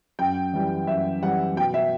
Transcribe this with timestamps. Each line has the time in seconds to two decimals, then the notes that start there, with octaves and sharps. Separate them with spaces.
0.19 F#2 G5
0.53 E3 G3
0.87 F#2 E5
1.23 E3 G3 F#5
1.57 B2 G5
1.74 E5